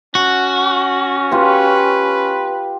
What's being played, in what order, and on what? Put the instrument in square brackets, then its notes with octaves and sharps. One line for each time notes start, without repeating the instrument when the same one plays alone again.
[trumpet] C#4 [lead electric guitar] F#4
[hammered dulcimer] F4 G4 [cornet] B4